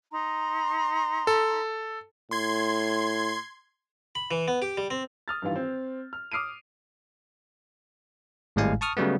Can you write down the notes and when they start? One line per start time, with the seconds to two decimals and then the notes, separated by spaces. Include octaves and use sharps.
0.12 D#4 A#5 C6
1.27 A4
2.31 A2 C6 G#6
4.15 B5
4.31 E3
4.48 B3
4.62 G4
4.78 G3
4.90 C4
5.28 D#6 F6 A6
5.42 G2 D#3 E3 F4
5.56 C4
6.13 F6
6.32 D6 D#6 F6 C7 D7 D#7
8.56 G#1 A2 G3 G#3 F5 G#5
8.81 A5 C#6 D#6 F6
8.97 C#3 F#3 G3 A3 B3